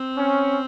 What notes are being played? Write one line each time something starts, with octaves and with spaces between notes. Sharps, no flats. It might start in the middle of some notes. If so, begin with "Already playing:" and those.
Already playing: C4
C#4